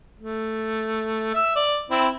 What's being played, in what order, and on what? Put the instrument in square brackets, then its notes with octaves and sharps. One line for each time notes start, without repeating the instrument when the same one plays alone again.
[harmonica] A3
E5 E6
D5
C4 E4